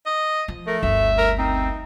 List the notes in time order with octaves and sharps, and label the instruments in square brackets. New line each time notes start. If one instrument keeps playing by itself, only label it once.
[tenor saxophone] D#5
[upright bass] F3
[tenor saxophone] A3 [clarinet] A#4
[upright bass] G1 D2 [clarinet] E5
[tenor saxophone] A#4
[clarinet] C4 [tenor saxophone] D#4